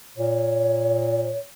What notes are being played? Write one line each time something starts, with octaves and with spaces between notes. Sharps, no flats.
A#2 C#5